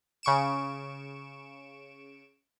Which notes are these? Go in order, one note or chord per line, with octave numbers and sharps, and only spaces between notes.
C#3 C#6 D7 E7